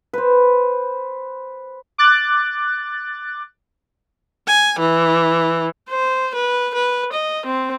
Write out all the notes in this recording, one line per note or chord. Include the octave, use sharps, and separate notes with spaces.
B4 C5
D6 F#6 A6
G#5
E3
C5
B4
B4
D#5
C4